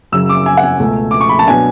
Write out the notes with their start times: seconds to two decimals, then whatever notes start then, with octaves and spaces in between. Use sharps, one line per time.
0.12 F#2 C#3 F#3 C#4 E6
0.29 D6
0.46 G#5
0.57 F#5
0.63 G#5
0.80 C#2 B2 A3
1.11 D6
1.21 C#6
1.29 B5
1.39 A5
1.47 B2 F#3 B3 D4 G#5